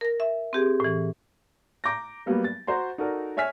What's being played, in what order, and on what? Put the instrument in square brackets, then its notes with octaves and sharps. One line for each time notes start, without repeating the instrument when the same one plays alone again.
[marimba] A#4 A#6
E5
C4 G4 G#4
A2 E3
[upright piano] A#5 D6 G6 A#6
F#3 G3 A#3 B3
A6
F#4 C5 A#5 C6
D#4 F#4 A4 A#4 D5
C#5 E5 G#5 F6 B6